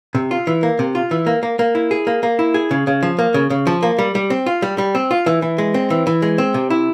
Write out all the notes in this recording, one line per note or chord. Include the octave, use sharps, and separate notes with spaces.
C3
F4
E3
A#3
C3
F4
E3
A#3
A#3
A#3
E4
G#4
A#3
A#3
E4
G#4
C#3
C#3
F3
A#3
C#3
C#3
F3
A#3
G3
G3
C4
F4
G3
G3
C4
F4
E3
E3
G#3
C4
E3
E3
G#3
C4
C3
E4